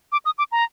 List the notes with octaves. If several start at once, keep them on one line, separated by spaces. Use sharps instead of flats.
D6
D#6
D6
A#5